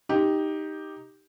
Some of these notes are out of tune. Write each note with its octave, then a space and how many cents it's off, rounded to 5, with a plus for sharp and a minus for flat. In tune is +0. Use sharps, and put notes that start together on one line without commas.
D#4 +0 G4 +0